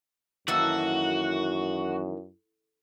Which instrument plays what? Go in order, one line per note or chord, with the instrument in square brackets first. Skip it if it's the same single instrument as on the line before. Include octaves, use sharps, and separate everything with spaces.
[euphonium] F#2 [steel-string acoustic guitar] D#3 E3 A#3 [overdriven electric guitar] F#4 [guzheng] A4